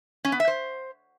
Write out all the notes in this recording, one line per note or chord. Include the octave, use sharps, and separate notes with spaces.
C#4
B3
E5
C5